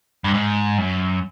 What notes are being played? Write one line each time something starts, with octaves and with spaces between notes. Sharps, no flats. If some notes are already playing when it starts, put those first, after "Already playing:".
G2
G#2
F#2